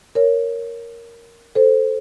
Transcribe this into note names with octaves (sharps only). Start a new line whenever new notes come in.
A#4 C#5
A4 C5